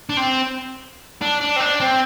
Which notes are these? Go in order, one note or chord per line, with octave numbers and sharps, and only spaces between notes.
D4
C4
D4
D4
C4
D4
C4